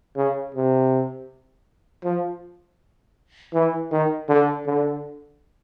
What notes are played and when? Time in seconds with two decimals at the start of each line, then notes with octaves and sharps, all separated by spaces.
0.16 C#3
0.55 C3
2.04 F3
3.54 E3
3.91 D#3
4.29 D3
4.66 D3